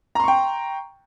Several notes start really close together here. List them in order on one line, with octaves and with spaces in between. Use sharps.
A#5 C6 C#6 G5